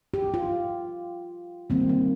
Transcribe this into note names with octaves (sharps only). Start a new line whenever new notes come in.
G4
F4
D#3 G3 A#3 C4
A#3